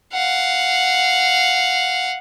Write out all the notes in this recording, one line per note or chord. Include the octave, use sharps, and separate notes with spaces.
F5 F#5